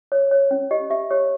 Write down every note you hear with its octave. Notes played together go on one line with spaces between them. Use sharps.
C#5
C#5
C#4
G4 D#5
G4 E5
G4 C#5